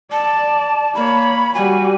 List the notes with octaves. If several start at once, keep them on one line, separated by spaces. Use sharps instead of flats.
D5 A5
A#3 C#5 B5
G3 F#4 G#5